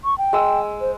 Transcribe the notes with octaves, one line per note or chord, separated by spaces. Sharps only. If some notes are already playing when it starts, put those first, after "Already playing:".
C#6
G5
G#3 E6
C5